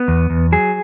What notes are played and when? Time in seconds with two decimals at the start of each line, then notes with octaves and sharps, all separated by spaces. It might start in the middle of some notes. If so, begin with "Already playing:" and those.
Already playing: B3
0.08 E2
0.30 E2
0.52 F#3 G#4